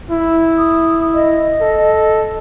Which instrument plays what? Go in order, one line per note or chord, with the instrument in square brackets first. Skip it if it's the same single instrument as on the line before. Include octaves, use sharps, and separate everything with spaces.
[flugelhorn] E4
[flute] D#6
D#5
[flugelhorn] A4